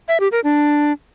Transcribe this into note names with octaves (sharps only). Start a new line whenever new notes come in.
E5
G4
A#4
D4